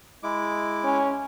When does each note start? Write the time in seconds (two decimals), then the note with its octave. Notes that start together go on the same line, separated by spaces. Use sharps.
0.23 G#3 E4 D6
0.84 C#4